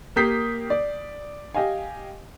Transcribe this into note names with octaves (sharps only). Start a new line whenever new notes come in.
A#3 G4 D#6 G6 B6 C7
D5
G4 D#5 F5 G#5